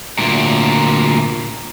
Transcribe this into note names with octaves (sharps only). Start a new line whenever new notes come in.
D2 A#2